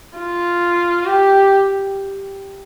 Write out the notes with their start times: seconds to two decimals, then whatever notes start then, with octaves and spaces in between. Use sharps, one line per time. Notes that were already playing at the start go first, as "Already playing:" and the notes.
0.17 F4
1.06 G4